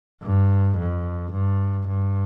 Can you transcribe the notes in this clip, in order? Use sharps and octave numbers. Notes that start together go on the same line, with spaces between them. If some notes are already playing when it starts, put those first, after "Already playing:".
G2
F2
G2
G2